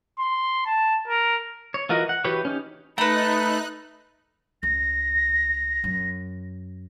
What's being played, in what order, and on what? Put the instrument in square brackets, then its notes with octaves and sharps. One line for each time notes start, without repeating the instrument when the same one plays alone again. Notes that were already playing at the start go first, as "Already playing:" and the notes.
[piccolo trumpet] C6
A5
A#4
[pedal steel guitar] C#5
E3 F4 F#4 A#4 D#5
F#5
E3 F#4 G4 B4 C#5
C#4 D#4 G4
[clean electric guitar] A3 [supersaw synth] D#4 F#6 [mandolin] B4 A#5 [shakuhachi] B5
[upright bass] C#2 [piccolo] A#6
[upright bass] F#2